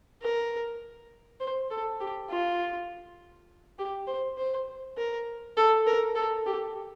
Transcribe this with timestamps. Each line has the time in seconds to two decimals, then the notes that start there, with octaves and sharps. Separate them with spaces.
0.22 A#4
1.40 C5
1.70 A4
2.00 G4
2.30 F4
3.79 G4
4.07 C5
4.38 C5
4.97 A#4
5.57 A4
5.86 A#4
6.15 A4
6.46 G4